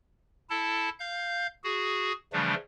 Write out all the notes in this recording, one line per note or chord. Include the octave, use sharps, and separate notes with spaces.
E4 A4 A5
F5 G6
F#4 G#4
C#3 E3 F3 G3 A3 D4